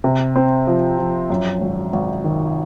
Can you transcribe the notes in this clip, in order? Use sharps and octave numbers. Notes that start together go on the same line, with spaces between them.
C3
C4
F3
F3
F#2
G#1
G#1
D#3